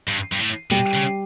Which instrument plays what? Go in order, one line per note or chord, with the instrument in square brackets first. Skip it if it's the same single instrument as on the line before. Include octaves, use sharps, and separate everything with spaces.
[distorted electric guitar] G2
G2
A2
[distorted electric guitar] B2 [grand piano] G3 G4
[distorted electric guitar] C#3